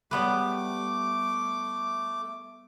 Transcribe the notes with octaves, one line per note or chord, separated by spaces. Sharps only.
G3 A3 B3 B4 D6